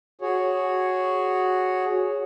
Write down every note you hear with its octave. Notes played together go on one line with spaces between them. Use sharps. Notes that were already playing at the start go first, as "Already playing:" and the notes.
F#4 G#4 C#5